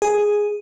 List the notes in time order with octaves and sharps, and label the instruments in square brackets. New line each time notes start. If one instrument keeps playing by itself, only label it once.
[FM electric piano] G#4